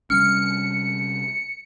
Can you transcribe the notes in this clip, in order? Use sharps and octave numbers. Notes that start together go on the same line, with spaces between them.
C3 G3 C#4 F6 C#7